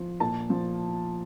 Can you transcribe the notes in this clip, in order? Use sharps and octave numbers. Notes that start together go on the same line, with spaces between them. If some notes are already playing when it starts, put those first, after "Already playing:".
Already playing: F3
A#2 A5
F3